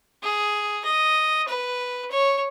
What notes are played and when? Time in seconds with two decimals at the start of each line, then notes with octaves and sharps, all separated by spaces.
0.23 G#4
0.85 D#5
1.48 B4
2.11 C#5